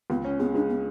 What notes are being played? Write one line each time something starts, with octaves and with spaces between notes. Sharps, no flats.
C#2 B3
C#4
G#3 B3
G#3 D4
B3